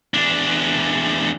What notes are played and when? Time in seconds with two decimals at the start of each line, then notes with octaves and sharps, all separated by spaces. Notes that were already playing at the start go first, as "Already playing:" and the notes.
0.14 E2 D4